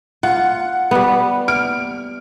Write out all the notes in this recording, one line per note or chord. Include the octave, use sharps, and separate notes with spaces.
F4 F#5
G3 B3
F6 D7